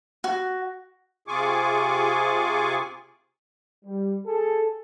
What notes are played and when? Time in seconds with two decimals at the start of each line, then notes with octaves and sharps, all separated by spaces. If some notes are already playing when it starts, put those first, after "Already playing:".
0.24 F#4
1.28 C3 F4 G#4 G#5 C#6 D6
3.84 G3
4.26 G#4 A4